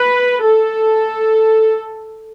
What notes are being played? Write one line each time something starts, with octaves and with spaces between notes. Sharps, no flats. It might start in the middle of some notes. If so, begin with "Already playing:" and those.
Already playing: B4
A4